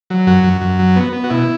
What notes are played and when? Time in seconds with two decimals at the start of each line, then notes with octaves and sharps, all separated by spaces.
0.10 F#3
0.27 F#2 F#4
0.44 F#2
0.61 F#2
0.79 F#3
0.96 B3
1.13 B3
1.24 F#4
1.30 B2 E4